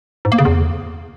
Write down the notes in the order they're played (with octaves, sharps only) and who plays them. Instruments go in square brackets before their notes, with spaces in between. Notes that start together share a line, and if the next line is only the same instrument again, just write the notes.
[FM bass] G#2
A#3
C#3
E2